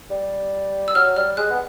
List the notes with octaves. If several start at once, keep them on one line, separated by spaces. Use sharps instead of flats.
G3
E6
F#3 F6
G3 F6
G#3 F#6
B3